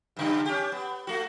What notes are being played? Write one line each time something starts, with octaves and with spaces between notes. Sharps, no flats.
G2 C#3 G3
C#4 G4
B3
A3 F#4